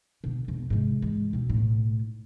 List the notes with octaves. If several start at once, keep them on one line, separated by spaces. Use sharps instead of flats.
B2 D3
E2 B2
G#2 C3
E3 G#3
B2 C4
B1 A2